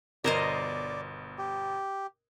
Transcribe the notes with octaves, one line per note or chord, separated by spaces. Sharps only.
G1 B2 A#4 C5 D5 D#5 G#6
G4